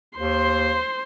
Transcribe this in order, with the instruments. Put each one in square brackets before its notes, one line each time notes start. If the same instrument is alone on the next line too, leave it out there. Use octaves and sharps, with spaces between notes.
[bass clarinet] D#2 [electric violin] C5 C6